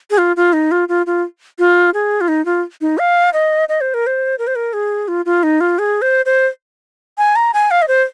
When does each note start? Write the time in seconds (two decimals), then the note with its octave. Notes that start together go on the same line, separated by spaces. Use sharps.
0.10 G#4
0.18 F4
0.36 F4
0.53 D#4
0.71 F4
0.88 F4
1.06 F4
1.59 F4
1.94 G#4
2.21 F4
2.28 D#4
2.45 F4
2.81 D#4
2.98 F5
3.33 D#5
3.69 D#5
3.81 C5
3.94 A#4
4.07 C5
4.38 A#4
4.47 C5
4.55 A#4
4.73 G#4
5.08 F4
5.25 F4
5.43 D#4
5.60 F4
5.78 G#4
6.02 C5
6.26 C5
7.18 G#5
7.36 A#5
7.54 G#5
7.71 F5
7.82 D#5
7.88 C5